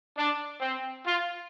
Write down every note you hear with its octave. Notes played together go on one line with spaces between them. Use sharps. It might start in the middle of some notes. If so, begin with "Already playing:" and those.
D4
C4
F4